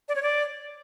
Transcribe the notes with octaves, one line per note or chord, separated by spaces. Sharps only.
D5
C#5
D5